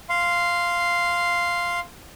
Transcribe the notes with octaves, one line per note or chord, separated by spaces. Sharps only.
F5 C6